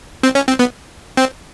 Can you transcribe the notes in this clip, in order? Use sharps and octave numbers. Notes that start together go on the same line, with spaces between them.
C4
C#4
C4
B3
C4